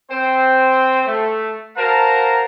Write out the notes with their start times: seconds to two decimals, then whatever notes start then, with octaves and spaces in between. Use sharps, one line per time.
0.10 C4 C5 G5
1.06 A3
1.77 F#4 A#4 C5 F5 A5 A#5